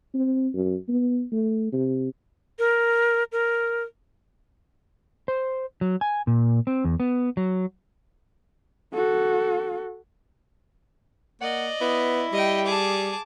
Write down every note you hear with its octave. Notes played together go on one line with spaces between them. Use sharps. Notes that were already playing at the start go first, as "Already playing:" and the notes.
C4
F#2
B3
A3
C3
A#4
A#4
C5
F#3
G#5
A#2
C4
E2
B3
F#3
F#4 A4
A#3 D5 D#5 F#5
B3 E4
G3 D#5 G5
G#4 A5 D6